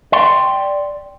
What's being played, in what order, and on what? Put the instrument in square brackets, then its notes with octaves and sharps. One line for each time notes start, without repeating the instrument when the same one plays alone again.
[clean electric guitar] D5 G5 C6